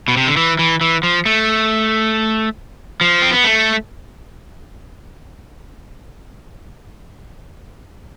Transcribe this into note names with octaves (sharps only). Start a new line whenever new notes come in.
B2
C3
D3
E3
E3
E3
F3
A3
F3
C4
B3
A3